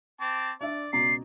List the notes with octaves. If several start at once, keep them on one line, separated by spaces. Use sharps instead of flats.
C4 A5 D6
D4 D5 E5
C#2 B2 D5 A#5 C7